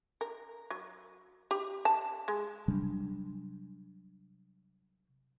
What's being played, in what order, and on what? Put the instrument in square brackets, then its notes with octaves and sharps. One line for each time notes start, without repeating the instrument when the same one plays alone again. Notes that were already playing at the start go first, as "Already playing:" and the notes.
[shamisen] A#4
F#3
G4
A5
G#3
[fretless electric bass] C3 F#3 G3 D4